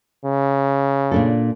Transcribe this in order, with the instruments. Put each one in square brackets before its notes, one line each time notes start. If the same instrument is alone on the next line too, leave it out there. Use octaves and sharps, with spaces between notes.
[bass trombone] C#3
[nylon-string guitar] A#2 D4 A4